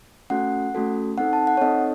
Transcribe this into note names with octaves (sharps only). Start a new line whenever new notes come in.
A3 C#4 F#4 A4 F#5
A3 C#4 F#4 A4
C4 D#4 A4 F#5
A5
F#5
C#5
C4 D#4 A4 D#5